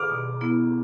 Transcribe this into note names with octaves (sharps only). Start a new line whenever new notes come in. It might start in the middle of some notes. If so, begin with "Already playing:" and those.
Already playing: D6 F6
B2
B3 E4